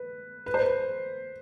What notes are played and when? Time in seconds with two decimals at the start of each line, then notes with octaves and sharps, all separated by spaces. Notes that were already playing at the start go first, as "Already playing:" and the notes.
Already playing: B4
0.46 B4
0.54 C5
0.62 B4